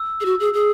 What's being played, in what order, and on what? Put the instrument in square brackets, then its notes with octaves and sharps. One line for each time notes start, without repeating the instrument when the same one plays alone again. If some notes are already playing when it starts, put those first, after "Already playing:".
Already playing: [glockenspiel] E6
[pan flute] G#4
F#4
G#4
G#4